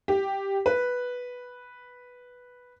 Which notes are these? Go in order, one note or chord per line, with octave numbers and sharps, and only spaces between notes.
G4
B4